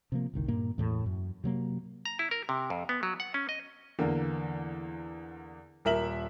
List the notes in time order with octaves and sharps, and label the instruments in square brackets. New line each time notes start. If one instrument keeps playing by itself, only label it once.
[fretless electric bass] C3 F3 A#3
G1 C2 D#3
G2 A#2 A#3
E2 A2 A3
F#2
C3 F#3 A#3
[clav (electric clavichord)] A#5
E4
A#4
C3
F2
B3
F#3
F#5
C#4
D#5
[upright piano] E2 D3 A#3
D#1 A#4 E5 F#7